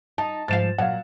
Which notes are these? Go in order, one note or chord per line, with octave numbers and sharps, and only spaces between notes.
D#4 A5
G#2 F3 F5 A6 E7
A#2 F#3 F5 F#5